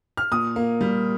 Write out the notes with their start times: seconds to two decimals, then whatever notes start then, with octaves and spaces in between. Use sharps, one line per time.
0.17 F6
0.32 A#2 D#6
0.56 A#3
0.81 G3